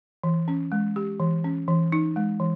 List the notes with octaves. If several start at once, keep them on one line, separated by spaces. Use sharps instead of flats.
E3
C#4
G#3
G4
E3
C#4
E3
D#4
G#3
E3